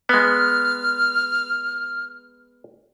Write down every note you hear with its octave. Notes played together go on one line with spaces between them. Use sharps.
G#3 B3 F6